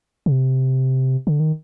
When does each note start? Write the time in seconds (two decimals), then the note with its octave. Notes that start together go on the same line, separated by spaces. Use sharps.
0.26 C#3
0.32 C3
1.27 D3
1.40 D#3